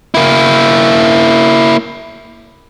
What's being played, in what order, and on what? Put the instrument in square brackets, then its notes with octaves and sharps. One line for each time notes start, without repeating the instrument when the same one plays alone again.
[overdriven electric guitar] A#3 E4